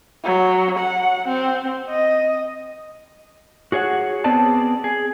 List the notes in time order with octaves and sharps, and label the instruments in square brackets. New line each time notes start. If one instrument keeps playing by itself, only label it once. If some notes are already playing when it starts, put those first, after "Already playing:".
[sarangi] F#3
F#5
C4
D#5
[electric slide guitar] F#4 G#4 C#5 D#5 F#5
B3 C4 G#4 B4 D5 A5
G#4